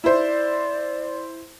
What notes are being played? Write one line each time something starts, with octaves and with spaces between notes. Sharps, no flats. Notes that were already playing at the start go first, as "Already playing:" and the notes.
E4 C5 D5